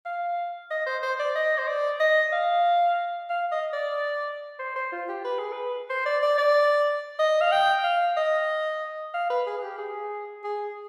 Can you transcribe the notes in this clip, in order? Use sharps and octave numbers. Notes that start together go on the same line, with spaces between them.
F5
D#5
C5
C5
D5
D#5
C5
D5
D#5
F5
F5
D#5
D5
C5
C5
F4
G4
B4
G#4
B4
C5
D5
D5
D5
D#5
F5
G5
F5
D#5
F5
B4
G#4
G#4
G4
G#4
G#4